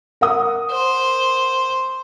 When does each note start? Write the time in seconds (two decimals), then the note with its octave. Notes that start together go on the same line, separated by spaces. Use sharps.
0.21 A#4 F#5 D#6
0.71 C5